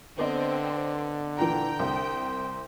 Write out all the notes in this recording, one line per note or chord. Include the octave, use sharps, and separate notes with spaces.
D3 B3 C4 D5 D#5
A#2 E3 G5 A#5
C2 C5